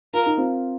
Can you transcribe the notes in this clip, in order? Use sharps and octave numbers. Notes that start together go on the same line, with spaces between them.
F4 A#4
D#4
C4 F4